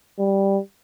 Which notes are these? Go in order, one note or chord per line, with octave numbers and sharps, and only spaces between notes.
G3